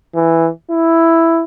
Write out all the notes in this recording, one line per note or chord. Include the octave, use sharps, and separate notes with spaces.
E3
E4